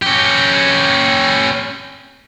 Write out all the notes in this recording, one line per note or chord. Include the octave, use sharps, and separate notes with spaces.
C#4 G4